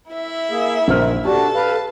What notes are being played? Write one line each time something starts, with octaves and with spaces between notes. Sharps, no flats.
E4 E5
A#3 G#4
A#1 D#3 D#4 C5 F6
D4 F#4 G4 A4 A5
B4 F5